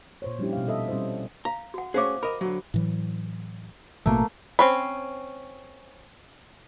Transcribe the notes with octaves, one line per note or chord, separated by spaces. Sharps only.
A#2 C5 C#5
F3 G3 C#4 D4 E4 G4
B2 F5
G3 A4 D#5 E5
G3 C4 C#4 E4 C5
F5 A#5
F#4 F#5
A3 C#4 G#4 C5 F5 D6
A#4 D#5 B5
D3 F#3
A2 E3 F#3
A1 B2 A3 A#3
C4 C#4 B5